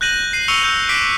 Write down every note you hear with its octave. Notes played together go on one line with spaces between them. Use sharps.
F#6 G6 A#6 D#7 F#7
C7 D#7
C#6 E6 C#7 D#7 F7 G7
E6 G6
D6 F#6 B6 C7 D7